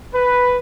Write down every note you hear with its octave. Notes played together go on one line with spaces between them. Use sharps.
B4